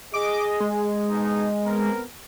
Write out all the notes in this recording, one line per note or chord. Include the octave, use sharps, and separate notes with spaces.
G#4 D#5 D6
G#3
B2 D#4
B3 C4 A#4